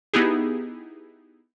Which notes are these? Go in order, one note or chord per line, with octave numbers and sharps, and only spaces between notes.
B3 D#4 E4 G4 G#4